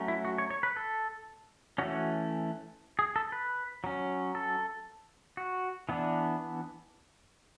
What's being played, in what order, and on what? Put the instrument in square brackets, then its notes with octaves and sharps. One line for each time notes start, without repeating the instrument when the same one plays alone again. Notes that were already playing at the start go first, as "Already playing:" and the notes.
Already playing: [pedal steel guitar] F#3 A3 C#4
E4
F#4
C#5
C#5
B4
A4
E3 A3 C#4 F#4
G#4
A4
B4
F#3 C#4
A4
F#4
E3 B3 D4